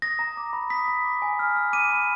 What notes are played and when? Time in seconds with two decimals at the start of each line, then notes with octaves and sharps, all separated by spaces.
0.02 D#6 A#6
0.19 A#5
0.37 D6
0.53 B5
0.70 D#6 B6
0.88 B5
1.05 D6
1.22 G#5
1.39 F6
1.56 F6
1.73 D6 D#7
1.90 B5